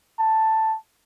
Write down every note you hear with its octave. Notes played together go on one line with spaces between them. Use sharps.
A5